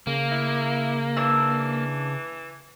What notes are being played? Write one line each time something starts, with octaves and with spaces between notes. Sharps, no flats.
C#3 A#3
E4
E3 D4 D6 E6